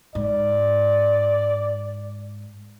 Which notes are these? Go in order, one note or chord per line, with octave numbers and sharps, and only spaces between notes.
G#2 D5